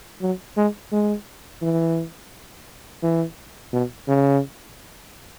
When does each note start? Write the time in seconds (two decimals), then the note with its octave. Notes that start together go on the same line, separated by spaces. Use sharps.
0.22 F#3
0.57 G#3
0.92 G#3
1.62 E3
3.02 E3
3.73 B2
4.08 C#3